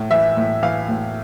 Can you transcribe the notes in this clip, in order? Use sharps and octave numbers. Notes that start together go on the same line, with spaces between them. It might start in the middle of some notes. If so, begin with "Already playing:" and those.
Already playing: A2
E3 E5
A2
E3 F5
A2